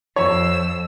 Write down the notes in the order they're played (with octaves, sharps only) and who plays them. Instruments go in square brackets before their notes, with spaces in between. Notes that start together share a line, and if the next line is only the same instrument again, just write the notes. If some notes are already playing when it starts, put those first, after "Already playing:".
[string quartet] F2 E6 [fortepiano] C#5